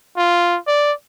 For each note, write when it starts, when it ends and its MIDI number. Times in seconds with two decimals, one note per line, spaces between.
0.17 0.58 65
0.67 0.93 74